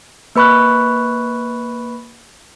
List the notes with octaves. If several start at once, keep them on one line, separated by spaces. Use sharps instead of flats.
A#3 B4 B5 C#6 F#6